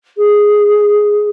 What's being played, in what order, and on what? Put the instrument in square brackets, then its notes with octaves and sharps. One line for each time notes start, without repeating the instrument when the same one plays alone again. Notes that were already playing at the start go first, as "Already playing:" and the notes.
[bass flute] G#4